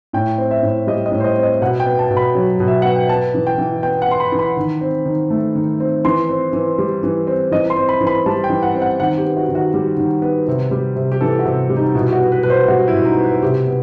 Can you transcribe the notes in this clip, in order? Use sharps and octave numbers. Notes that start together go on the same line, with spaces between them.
A2 G5
C4
E5
A2
G3 D#5
D#5
A2
C5
D#5
C4
D#5
B2 F#5
G5
B3
A5
B2
B5
F#3
B2
E5
B3 F#5
G5
B3 A5
E3
G5
E3
B3 G5
F#5
B3 C6
B5
E3
B5
D#3
C4
D#3
A3
D#3
C4
E3 C6
C4
E3
G3
E3
C4
E3 D#5
C6
C4
B5
E3
B5
G3 A5
G5
E3
F#5
C4
F#5
D#3 F#5
G4
B3
F#4
D#3
F#4
G3
D#3
B3
C3
G3
C3
G4
E3 A4
F#4
C3
G3
D#4
B2 E4
G4
F#4
B3
B4
B2 B4
C5
G3 F#4
E4
B2
D#4
B3
B4
C3 G4
B3